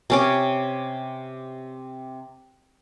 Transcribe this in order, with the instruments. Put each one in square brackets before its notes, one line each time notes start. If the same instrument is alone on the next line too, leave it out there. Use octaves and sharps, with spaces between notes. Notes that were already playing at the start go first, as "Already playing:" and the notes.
[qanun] C3 C#4 D6